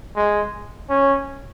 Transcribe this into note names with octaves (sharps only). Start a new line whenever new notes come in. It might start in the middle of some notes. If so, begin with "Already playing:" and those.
G#3
C#4